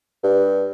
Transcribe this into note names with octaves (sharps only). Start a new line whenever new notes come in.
G2